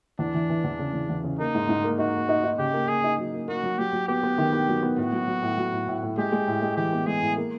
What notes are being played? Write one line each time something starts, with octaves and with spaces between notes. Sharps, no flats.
E2 D4
E3
E3
E2
C#3
E2
E2
C#3
A#3 D#4
G#2
G#2
A#3
D#4 F#4
A#3
D#4
D#4
C#3 G4
A#3
A#3 G#4
D#4
F#3
A#3
A#3 F#4
F#3
F#3 G4
F#3
B3 G4
B3
D#3
B3
F#3
B3
A2 F#4
F#3
F#3
A2
F#3
A2
A2
A2
G#3 G4
G#3
A2
G#3
E3 G4
B3
G#3 G#4
A2
A#3